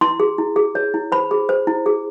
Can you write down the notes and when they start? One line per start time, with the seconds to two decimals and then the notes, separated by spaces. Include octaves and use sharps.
0.01 E4 C6
0.20 G#4
0.38 E4
0.56 G#4
0.75 C#5
0.94 E4
1.12 C5 B5
1.31 G#4
1.49 C5
1.67 E4
1.86 G#4